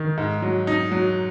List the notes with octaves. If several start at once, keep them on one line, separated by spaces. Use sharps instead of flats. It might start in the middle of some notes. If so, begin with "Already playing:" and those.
Already playing: D#3
G#2
F#3
D#4
F#3